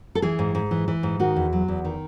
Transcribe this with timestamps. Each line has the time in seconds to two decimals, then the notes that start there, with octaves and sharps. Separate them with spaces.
0.15 A4
0.22 E3 G#4
0.39 G#2
0.55 G#2
0.71 E3
0.88 E3
1.03 G#2
1.20 D#3 F#4
1.36 E2
1.53 F#3
1.68 E2
1.85 D#3